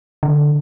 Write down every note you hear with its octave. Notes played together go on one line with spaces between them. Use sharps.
D3